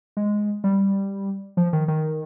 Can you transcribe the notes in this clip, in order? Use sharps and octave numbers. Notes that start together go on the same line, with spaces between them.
G#3
G3
F3
D#3
D#3